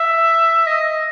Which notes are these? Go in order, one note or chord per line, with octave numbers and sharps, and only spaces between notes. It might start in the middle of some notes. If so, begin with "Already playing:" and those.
Already playing: E5
D#5